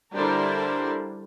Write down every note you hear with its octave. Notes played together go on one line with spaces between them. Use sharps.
D3 G3 D4 E4 A#4 C5